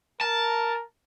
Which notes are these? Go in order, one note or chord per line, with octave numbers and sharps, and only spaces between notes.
A#4 A5